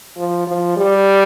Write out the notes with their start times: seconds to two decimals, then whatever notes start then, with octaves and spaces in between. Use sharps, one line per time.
0.17 F3
0.47 F3
0.77 G3